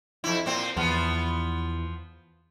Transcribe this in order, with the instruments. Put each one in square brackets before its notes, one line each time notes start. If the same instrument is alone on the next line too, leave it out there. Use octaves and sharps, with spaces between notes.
[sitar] F2 E4
A#2 C4
[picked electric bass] E2 [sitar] F3 B3